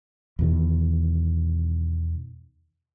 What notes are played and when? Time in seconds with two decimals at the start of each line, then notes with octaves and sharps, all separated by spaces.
0.39 E2 B2 D#3